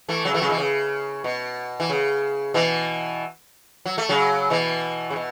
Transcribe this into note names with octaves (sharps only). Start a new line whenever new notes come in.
E3 A3
C#3 F#3
E3 A3
C#3 F#3
B2 E3
C#3
B2
E3
C#3
B2 E3
F#3
A3
C#3 F#3
B2 E3
C#3
B2